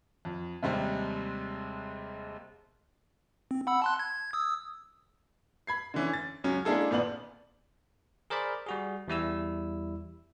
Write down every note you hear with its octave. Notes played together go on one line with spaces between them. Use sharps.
F2
D#2 C3 G3 G#3
C4
F#5 B5 E6
A5 C6 F#6
G#6
D#6 E6
B5 G#6 C7
D3 E3 C#4
A6
C#2 F#3 C#4
G#3 A#3 D4 E4 G#4 A4
G#1 A#2 B3 D5 F#7
G#4 A#4 C5 D5 B5
G3 F#4 G#4
E2 G3 E4 E6